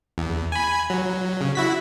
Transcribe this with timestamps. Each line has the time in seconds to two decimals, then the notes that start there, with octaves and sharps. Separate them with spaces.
0.18 E2
0.52 G#5 B5
0.90 F#3
1.41 C#3
1.55 E4 F#4 B6